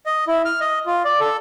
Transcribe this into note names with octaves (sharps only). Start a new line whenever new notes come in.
D#5
E4
F6
D#5
F4
D5
A4